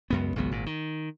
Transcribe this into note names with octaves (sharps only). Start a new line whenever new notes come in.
C#2 F#2 B3
G#1 C#2 F#3 B3
G#1 A#2
D#3